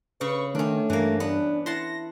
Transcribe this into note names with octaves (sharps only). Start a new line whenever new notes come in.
C#3 B4 C#6
D#3 A3 C#4 D4
G2 E3 A#3
B3 D4
E4 F#5 A5 C6 A#6